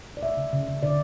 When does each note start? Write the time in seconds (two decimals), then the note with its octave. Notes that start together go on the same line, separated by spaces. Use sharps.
0.17 D5
0.23 A3 E5
0.37 C#3
0.53 C#3
0.68 C#3
0.83 D3 D5